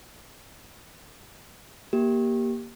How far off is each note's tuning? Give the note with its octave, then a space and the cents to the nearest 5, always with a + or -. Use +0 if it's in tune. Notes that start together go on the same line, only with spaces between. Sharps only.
A#3 +15 G4 +0